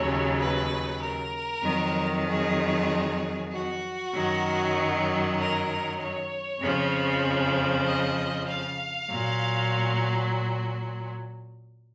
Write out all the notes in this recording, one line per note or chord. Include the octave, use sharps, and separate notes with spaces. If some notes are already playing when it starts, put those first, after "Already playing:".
Already playing: D#2 C#3 F#3 C#5
B4
A#4
F2 D#3 F#3
G#4
F#4
F#2 D#3 F#3
A#4
C#5
F2 C#3 F3
D#5
F5
A#2 F#3